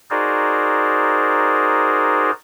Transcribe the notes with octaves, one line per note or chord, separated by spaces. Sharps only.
D#4 F#4 G#4 A#4 C5 D5